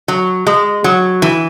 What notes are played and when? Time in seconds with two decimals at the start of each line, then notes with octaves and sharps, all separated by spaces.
0.08 F#3
0.47 G#3
0.84 F#3
1.22 E3